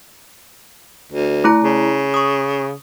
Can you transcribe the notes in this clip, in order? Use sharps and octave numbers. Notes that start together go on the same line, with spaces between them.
D2
A3 E4 A#5
C#3
C#6 D#6